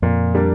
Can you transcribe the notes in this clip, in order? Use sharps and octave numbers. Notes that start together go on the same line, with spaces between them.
F2 A#2
G3 A#3 D4